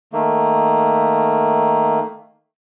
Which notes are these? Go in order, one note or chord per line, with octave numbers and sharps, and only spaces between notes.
D#3 A3 A#3